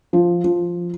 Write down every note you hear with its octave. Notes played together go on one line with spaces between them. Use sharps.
F3
F3